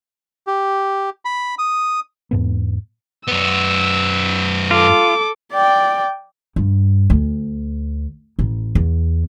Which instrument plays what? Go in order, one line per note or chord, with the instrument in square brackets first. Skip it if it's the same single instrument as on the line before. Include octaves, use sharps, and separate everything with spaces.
[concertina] G4
B5
D#6
[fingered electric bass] E2 G#2 B3
[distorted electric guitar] F#2 B3 [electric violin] E6
[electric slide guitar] F4 [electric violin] A4 D6
[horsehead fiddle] D5 G5
[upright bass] G2
D2
A1
E2